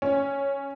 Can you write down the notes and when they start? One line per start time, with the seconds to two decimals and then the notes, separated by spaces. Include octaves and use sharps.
0.02 C#4